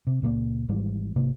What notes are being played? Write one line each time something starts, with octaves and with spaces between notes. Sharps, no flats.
C3
C#2 A#2 F3 A#3
G#1 G#2 E3 G3
G#1 C3 A#3